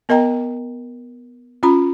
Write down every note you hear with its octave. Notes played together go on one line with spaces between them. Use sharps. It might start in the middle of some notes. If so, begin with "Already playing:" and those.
B3 A#4 D#5 G5 A#5
C#4 F4 A#5 B5